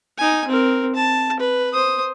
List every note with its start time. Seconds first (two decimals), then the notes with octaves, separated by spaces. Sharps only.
0.18 D#4 G#5
0.48 C4 A#4
0.95 A5
1.40 B4
1.73 C5 D#6